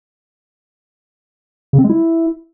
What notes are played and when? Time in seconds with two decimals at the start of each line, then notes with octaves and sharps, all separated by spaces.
1.73 C#3
1.79 C4
1.84 G#3
1.90 E4